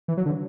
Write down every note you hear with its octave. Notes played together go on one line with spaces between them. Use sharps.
E3
F#3
D3